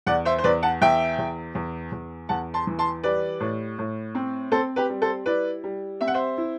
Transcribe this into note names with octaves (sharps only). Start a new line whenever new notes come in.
E2 D5 F#5
C5 E5
C5
E2 B4 D5
F#5 A5
E2 E5 G5
E2
E2
E2
E2 F#5 A5
A5 C6
E3
A5 C6
G3 B4 D5
A2
A2
C4
C4 A4 C5
G4 B4
G3
A4 C5
E4 B4 D5
G3
C4 E5
F#5
C5 E5
E4